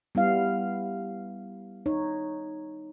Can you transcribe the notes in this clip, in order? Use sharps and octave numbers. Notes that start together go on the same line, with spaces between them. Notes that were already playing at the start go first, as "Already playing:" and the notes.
G3 B3 E4 F5
D#4 C#5